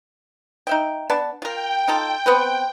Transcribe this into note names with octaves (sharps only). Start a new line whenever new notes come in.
D#4 E5 G5
B3 D4 A5
F4 A#4 G5
D#4 F4 A4
B3 C4 B4